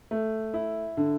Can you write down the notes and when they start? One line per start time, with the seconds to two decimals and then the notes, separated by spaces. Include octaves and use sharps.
0.11 A3
0.54 E4
0.97 D3